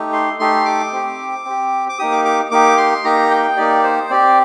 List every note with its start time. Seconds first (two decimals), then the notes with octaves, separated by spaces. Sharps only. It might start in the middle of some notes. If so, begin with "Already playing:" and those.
Already playing: A3 D#4 G4
0.13 C6
0.40 A3 D#4 G4 C6
0.65 D6
0.93 C4 G4
1.45 C4 G4
1.89 D6
1.99 A#3 D#4 G4 D#6
2.12 D6
2.25 D6
2.51 A#3 D#4 G4 D6
2.77 C6
3.04 A#3 D#4 G4 A#5
3.31 G5
3.57 A#3 D#4 G4 D5
3.83 C5
4.10 C4 G4 D5